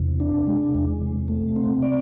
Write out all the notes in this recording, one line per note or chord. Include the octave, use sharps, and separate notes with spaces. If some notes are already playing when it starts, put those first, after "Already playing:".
Already playing: E2 C3
D4
G#3
E2
C3
A3
C4
D5